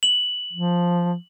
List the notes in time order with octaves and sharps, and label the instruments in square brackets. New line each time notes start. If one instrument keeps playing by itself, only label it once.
[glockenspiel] F#7
[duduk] F3